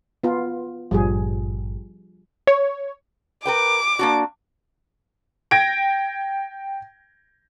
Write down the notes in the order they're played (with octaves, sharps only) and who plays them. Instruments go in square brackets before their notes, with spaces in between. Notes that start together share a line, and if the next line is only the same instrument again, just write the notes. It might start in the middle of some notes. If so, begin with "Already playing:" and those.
[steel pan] B3 F4
[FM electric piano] G#1 G2 A#2 [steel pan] F3 G3 G#4
[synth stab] C#5
[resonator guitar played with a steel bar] A#4 B4 G5 [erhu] D6
[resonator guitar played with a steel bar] A#3 D4 F#4
[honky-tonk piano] G5 G#6 A#6 D7